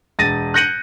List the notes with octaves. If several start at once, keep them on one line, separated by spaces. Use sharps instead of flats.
E1 A6 A#6 D#7
F#6 G6 A#6 C#7 D#7 F#7